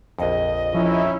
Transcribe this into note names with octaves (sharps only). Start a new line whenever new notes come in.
A#1 F2 D#5
F3 C#4 D#4 E4